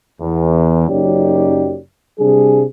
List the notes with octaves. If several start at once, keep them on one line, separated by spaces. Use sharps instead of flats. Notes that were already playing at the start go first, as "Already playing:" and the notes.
E2
F#1 F#2 D#4 G4 C#5 D5
C3 G3 D4 G#4